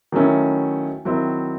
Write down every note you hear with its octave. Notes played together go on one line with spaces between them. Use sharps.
D#3 F#3 A3 C#4 E4
D#3 F#3 C4 E4